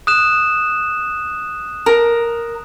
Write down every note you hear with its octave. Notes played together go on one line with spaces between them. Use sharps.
D#6 F#6 E7
A#4